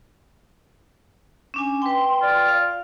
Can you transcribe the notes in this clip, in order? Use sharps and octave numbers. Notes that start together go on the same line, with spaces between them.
C#4 D4 G#5
B4 G5 C6
F4 D5
F5